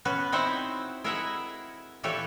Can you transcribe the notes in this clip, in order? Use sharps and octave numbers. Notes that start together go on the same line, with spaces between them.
B3 C#4 F#4 B4
C4 D#4 E4 C5 E5 F#5
E4 G#4 A#4 D#5 E5 F#5
A#2 E3 G4 A4 B4 C#5